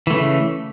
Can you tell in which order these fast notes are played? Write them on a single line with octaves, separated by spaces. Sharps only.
E3 A3 C#3